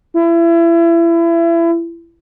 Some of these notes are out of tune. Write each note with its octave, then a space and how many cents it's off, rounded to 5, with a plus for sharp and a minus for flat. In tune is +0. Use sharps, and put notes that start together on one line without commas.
E4 +30